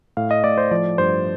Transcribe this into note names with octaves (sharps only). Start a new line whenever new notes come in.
A2 F5
D#5
A2 D5
C5
F3 D5
G2 C5